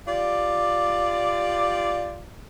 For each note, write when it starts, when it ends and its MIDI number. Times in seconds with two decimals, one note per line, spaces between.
0.07 2.20 65
0.07 2.20 67
0.07 2.20 74